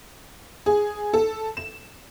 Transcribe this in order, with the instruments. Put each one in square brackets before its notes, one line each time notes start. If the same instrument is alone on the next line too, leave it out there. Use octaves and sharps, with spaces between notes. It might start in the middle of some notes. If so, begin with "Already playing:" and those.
[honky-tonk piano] G#4
A4
E7